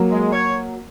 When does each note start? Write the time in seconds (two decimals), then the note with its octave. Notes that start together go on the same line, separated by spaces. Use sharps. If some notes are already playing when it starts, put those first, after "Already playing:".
Already playing: F#3 A#3
0.11 G#3
0.32 C#5